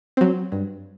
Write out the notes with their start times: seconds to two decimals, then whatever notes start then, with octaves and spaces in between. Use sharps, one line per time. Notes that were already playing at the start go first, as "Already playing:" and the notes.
0.17 F#3 C4
0.52 G2